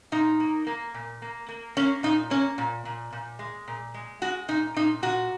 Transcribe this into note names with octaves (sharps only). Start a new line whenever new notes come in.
A#2 D#4
A#3
A#3
A#2
A#3
A#3
A#3 C#4
A#2 D#4
A#3 C#4
A#2
A#2
A#2
G#3
A#2
G#3
G#3 F#4
A#2 D#4
A#2 D#4
A#2 F#4